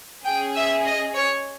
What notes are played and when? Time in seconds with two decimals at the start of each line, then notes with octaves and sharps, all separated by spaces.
0.25 C#4 G#4 G5
0.55 E5
0.85 D#5
1.15 C#5